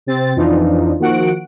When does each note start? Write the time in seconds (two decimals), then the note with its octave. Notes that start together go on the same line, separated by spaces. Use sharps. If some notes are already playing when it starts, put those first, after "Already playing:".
0.06 C3 C4 A6
0.36 F2 E3 F3 D4 D#4 F4
0.99 D#3 F3 A#3 F#4 F#5 D7